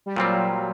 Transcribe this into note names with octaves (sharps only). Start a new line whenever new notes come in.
G3
A#2 F#3 G3 C4 F4